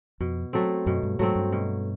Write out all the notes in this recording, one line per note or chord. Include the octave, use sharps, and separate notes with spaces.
F2 B2
F#3 A3 C4
F#2 B2
G2
G#2 F#3 A3 C4
G2
B2